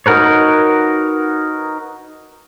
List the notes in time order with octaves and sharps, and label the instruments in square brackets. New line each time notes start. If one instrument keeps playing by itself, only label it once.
[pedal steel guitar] D#4 F#4 A#4 B4 C#5